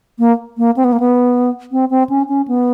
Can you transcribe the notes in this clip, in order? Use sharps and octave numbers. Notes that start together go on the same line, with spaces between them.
A#3
A#3
C4
B3
A#3
B3
C4
C4
C#4
C#4
B3